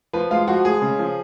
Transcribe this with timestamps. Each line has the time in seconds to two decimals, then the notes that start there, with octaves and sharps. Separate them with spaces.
0.13 F3 B4
0.31 G#3 F4
0.48 F3 F#4
0.65 G#3 G#4
0.82 C#3
0.99 F3